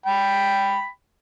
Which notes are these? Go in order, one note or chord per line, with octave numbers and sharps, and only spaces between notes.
G5 B5